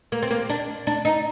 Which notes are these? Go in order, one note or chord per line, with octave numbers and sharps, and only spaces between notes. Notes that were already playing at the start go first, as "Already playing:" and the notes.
A#3
C4
A#3
D4
D4
D#4